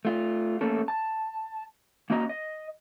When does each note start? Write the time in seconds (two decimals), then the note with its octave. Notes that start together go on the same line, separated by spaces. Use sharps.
0.05 A3 F4
0.61 A3 A#3 C#4 A4
0.88 A5
2.10 A#3 C#4 F#4 D#5 A#5
2.29 D#5